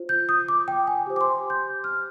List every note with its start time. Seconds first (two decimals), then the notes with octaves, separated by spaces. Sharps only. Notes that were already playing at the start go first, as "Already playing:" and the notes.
Already playing: F4 C5
0.09 G6
0.29 D#6
0.49 D6
0.68 G5
0.87 G#5
1.07 G4 C5
1.16 D6
1.21 C6
1.50 G6
1.84 F6